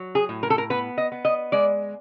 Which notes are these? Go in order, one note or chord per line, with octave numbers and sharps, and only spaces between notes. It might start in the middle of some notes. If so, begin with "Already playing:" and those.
Already playing: F#3
G#4
A2
A#4
A4
A#4
B3 B4
D#5
B3
D#5
G#3 D5